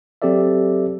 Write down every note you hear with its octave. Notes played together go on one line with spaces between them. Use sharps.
F#3 C4 G4 A4 D5 E5